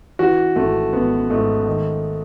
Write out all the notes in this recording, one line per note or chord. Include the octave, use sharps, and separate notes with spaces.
E3 F#4
G#1 A3
G#1 B3
G#2 A3
D#3